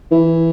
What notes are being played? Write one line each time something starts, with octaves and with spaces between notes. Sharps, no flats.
E3